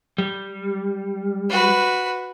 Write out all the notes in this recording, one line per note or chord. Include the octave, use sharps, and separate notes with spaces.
G3
F#4 B4